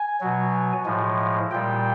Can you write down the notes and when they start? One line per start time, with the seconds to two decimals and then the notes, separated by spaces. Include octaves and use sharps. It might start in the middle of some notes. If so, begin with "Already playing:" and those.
Already playing: G#5
0.21 B2 F#3
0.86 A2 F3 G#3
1.51 A#2 G3 G5